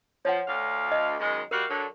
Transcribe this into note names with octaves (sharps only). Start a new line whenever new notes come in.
F3 C#5 F#5
D2 F5
D#5
F#2 D#3 G#3
G3 F#4 A#4 F5
D3 F#3